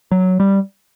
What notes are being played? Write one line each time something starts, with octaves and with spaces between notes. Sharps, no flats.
F#3
G3